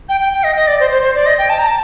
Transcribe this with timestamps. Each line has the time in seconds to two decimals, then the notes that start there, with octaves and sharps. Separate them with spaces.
0.09 G5
0.20 G5
0.33 G5
0.44 D#5
0.56 D#5
0.67 D5
0.80 C5
0.91 C5
1.02 C5
1.15 D5
1.26 D#5
1.38 G5
1.49 A5
1.59 A#5
1.67 A5